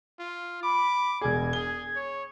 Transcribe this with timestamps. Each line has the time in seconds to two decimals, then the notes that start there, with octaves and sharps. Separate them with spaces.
0.19 F4
0.63 B5 D6
1.21 E1 G#4 G#6
1.53 G#4 G7
1.96 C#5